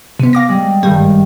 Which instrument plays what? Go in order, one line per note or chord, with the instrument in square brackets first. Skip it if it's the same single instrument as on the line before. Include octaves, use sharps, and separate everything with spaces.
[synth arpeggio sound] C3 B3
F5 D6 A#6
[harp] G3 G#3
[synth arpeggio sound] G#1 G3 [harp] G2 D#3